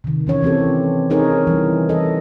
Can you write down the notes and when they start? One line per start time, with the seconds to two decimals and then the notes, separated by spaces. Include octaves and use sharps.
0.04 C3 D#3
0.27 E3 C#4 C#5
0.43 E3 C4 G4 A4
1.10 C4 D#4 G#4 A#4 C#5
1.47 E3 G3
1.89 A4 D#5